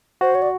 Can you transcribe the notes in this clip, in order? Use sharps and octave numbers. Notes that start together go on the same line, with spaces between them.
F#4 C5
C#5
D5